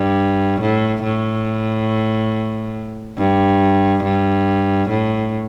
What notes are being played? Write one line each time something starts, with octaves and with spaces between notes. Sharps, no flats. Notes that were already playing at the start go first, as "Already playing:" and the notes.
Already playing: G2
A2
A2
G2
G2
A2